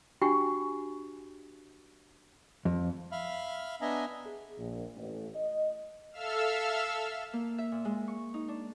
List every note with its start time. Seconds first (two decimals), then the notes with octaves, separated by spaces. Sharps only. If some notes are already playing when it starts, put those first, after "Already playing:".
0.21 D4 F#4 G4 G5 G#5 C#6
2.65 F2
3.12 E5 F5 B5 F6
3.81 B3 D4 D#5 E5 G#5 A#5
4.26 G#4
4.58 A#1
4.96 A1
5.35 D#5
6.12 A4 E5 F5 E6 F6
7.33 A#3
7.58 E5
7.72 A#2
7.85 G#3
8.08 C#6
8.34 D#4
8.48 D4